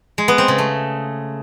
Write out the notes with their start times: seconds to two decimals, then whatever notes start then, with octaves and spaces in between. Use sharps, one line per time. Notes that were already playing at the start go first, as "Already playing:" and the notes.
0.18 G#3
0.28 B3
0.38 C4
0.48 C#3
0.58 A3